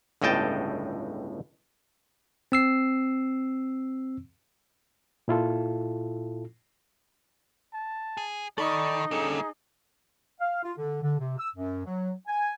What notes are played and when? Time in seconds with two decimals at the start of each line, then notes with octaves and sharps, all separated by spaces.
0.22 G1 C#2 A2 D#5 G5 A5
2.52 C4 E6 C7
5.28 A#2 E4 F4 A4
7.74 A5
8.17 G#4
8.58 D#3 D#4 A4 D5 B5 C#6
9.11 D3 G3 A#3 C#4 G#4 A4
10.40 F5
10.63 F4
10.77 D3
11.02 D3
11.18 C3
11.38 E6
11.55 F#2
11.85 F#3
12.27 G#5